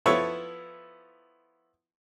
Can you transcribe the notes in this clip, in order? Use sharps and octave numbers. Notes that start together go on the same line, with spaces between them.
F3 B3 E4 A4 C#5 E5